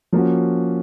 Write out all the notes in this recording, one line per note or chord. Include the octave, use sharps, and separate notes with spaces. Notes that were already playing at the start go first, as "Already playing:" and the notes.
F3 A#3 C#4 F#4